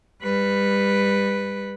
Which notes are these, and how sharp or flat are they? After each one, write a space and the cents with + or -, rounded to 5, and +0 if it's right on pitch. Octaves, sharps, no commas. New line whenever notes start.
G3 +25 B4 +0